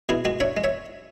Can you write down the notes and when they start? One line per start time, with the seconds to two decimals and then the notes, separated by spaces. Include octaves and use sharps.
0.09 B2 E4 G#4
0.25 G#3 F#4
0.40 D4 C#5 E5
0.57 G#3
0.64 C#5 E5